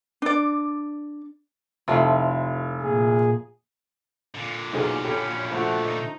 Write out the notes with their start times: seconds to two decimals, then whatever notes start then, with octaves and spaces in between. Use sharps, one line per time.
0.22 D4 D5
1.88 F1 F3 A3 E4
2.81 A#2 G#4
4.35 A#2 D3
4.73 B1 F#3 C#4 D#4 G#4 D5
5.04 F#2 C#4 G4 A4 B5
5.51 F3 A3 F#4
5.85 D#4